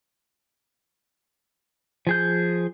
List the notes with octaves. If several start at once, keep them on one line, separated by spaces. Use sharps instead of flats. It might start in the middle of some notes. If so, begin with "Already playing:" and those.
F3 G#4 G6